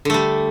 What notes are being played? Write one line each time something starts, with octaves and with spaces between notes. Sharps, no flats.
D3 G3 A3